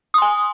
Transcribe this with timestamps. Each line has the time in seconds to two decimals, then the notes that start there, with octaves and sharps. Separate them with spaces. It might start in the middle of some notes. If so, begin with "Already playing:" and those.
0.14 D#6
0.18 C6
0.22 G#5